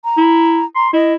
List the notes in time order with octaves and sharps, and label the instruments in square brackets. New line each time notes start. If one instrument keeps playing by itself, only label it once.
[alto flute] A#5
[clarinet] E4
[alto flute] A#5 [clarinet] C6
[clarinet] E4 [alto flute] D#5